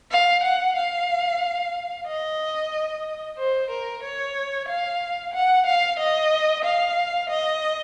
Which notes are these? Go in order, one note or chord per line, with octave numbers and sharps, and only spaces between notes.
F5
F#5
F5
D#5
C5
A#4
C#5
F5
F#5
F5
D#5
F5
D#5